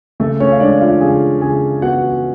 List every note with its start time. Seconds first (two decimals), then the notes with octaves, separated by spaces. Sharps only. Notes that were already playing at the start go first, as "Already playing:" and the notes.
0.20 C#3 A3 A4
0.40 C#4 C#5
0.52 F5
0.60 G#3 D4 D5
0.81 F4 F5
1.01 C#3 G#4 G#5
1.41 C#3 G#4 G#5
1.82 B3 F#4 F#5